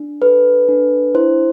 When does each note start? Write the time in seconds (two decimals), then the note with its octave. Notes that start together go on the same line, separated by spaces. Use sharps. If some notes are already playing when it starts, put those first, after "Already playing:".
Already playing: D4
0.22 A4 B4
0.69 D4
1.15 E4 C5